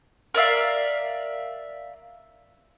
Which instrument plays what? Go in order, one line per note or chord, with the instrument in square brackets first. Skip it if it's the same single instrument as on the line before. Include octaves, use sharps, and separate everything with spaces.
[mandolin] A#4 D5 E5 F5